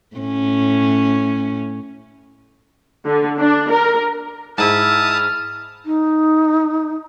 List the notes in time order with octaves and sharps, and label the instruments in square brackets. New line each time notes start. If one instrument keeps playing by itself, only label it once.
[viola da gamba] A2 C#4
[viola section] D3
D4
A#4
[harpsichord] G#2 [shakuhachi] E4 [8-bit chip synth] A5 D#6 [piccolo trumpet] F6
[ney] D#4